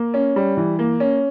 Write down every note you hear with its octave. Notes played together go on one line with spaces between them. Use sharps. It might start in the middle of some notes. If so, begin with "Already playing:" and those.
Already playing: A#3
C#4
G3
E3
A#3
C#4